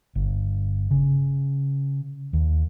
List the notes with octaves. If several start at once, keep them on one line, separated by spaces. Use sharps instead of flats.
G1
C#3
D#2